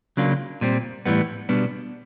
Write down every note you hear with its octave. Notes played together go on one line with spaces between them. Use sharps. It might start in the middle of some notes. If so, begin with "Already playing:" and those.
C#3 F#3 A#3 D4 F4
A#2 G3 C4
A2 E3 G3 B3
B2 G3 B3 D4